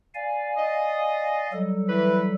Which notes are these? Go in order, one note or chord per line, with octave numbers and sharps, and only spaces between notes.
D5 F5 G#5
D#5
F#3 G3 A4
E3 B4